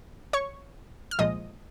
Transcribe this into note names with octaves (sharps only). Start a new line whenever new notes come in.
C#5 C#6
F6
C2 A#2 F3 G#3 D#5 D#6